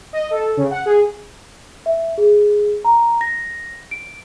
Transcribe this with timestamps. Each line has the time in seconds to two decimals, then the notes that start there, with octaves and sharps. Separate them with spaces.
0.13 D#5
0.31 A4
0.57 C#3
0.71 F#5
0.86 G#4
1.86 E5
2.18 G#4
2.85 A#5
3.21 A#6
3.91 D7